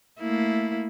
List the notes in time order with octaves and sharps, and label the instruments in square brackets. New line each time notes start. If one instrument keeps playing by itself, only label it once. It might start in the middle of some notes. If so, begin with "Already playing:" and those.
[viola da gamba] A3 A#3 E4